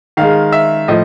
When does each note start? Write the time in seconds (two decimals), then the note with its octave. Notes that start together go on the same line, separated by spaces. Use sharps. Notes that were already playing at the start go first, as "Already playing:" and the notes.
0.17 D#3 G#3 F5
0.52 E5
0.88 A2 F3 D#5